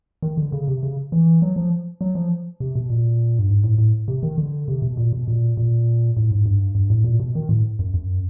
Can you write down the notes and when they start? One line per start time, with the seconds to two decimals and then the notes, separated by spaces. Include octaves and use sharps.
0.22 D#3
0.37 D3
0.52 C#3
0.68 C3
0.83 C#3
1.12 E3
1.42 F#3
1.56 F3
2.01 F#3
2.15 F3
2.60 C3
2.75 B2
2.90 A#2
3.39 G2
3.49 G#2
3.64 A2
3.78 A2
4.08 C3
4.23 D#3
4.38 D3
4.68 C3
4.82 B2
4.97 A#2
5.13 B2
5.28 A#2
5.57 A#2
6.17 A2
6.31 G#2
6.46 G2
6.75 G2
6.90 A2
7.04 A#2
7.20 B2
7.35 D#3
7.49 A2
7.79 F#2
7.94 F#2